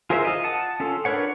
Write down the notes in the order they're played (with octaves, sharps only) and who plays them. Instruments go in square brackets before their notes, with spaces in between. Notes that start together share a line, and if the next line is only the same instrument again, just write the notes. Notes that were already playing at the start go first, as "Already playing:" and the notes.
[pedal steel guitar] F4 G#4 A#4 C5 E5
F4 D#5
F#5 A5 D#6
C#4 F4 A4
D4 A#4 B4 C#5 F#5